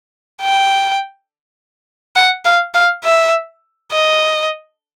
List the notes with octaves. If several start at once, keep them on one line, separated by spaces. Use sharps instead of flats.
G5
F#5
F5
F5
E5
D#5